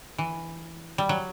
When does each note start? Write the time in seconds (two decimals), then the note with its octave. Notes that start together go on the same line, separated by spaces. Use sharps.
0.18 E3
0.98 G3
1.09 F#3